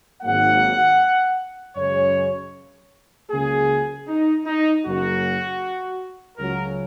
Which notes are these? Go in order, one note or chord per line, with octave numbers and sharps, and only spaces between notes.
G#1 G#2 F#3 A#3 F#5
F#2 C#3 G#3 C#5
C#2 C#3 F#3 A#3 G#4
D#4
D#4
F#1 F#2 C#3 F#3 A#3 F#4
C#2 C#3 F#3 A#4